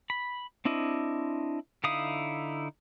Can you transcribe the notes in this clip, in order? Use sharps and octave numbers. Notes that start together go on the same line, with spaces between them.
B5
C4 D4 E4 D#5
D3 D#4 E4 F5 D#6